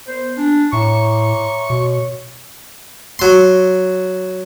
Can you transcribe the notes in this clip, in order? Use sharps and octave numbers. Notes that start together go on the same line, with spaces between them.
B3 C5
D4 G#5
A2 C#5 E5 A#5 C#6
B2 C#5
F#3 C6